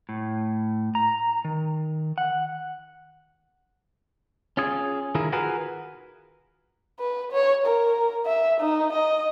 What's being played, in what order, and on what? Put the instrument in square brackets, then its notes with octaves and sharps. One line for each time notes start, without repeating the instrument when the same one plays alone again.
[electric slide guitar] A2
A#5
D#3
F#5
[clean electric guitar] C#4 F4 G#4
D#3 E4 F4 G#4 A#4
F4 F#4 G#4 A#4 B4 G#5
[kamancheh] B4
C#5
A#4
E5
D#4
D#5